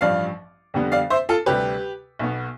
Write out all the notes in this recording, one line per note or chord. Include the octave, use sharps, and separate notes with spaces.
A1 G2 F3 D5 F5
F2 D3 G3 B3
D5 F5
C5 E5
F4 A4
D2 C3 G3 G4 B4
B1 B2 B3